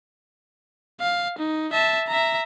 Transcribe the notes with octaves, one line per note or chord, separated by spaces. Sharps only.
F5
D#4
E5 A5
E5 A#5